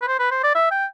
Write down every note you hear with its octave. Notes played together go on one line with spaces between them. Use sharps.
B4
C5
B4
C5
D5
E5
G5